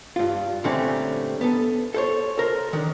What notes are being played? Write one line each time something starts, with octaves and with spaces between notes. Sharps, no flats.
G2 F4
A#2 D3 G3 A3 C4 C#4
B3 A4
A4 C5 C#5
A4 A#4 C5
D#3 D4